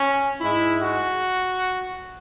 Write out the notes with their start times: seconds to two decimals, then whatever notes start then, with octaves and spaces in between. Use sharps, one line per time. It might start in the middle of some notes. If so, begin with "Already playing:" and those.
Already playing: C#4
0.41 G#2 G#3 E4
0.80 F#4